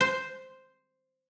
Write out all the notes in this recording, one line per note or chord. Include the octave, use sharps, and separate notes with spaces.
C5